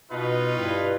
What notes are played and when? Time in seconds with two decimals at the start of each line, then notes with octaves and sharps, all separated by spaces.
0.11 B2 D#4 F4 B4
0.55 G2 E4